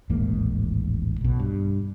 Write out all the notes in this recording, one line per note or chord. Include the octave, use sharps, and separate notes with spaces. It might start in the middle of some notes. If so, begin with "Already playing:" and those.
D#1 A1 G#2 A#3
B1 B2
G2